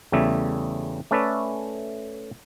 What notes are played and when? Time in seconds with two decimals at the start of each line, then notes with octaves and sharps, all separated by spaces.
0.12 E2 C#3 G3 A3 E5
1.11 A3 C#4 A4 B4 D5 E5